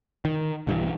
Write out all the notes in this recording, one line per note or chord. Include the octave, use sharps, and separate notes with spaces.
D#3
B1 G2 D#3 E3